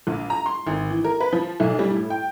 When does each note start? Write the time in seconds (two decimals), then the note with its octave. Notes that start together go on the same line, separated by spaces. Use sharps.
0.07 A#1
0.30 A#5
0.46 C6
0.67 G#1
0.90 E3
1.04 A#4
1.20 B4
1.33 F3
1.60 B1
1.79 G3
1.91 A2
2.10 G5